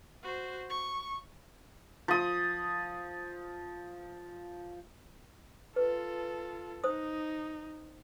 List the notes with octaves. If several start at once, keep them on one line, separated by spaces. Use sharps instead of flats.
F#4 C5
C#6
F3 D#6
F4 A4 B4
D#4 C5 D#6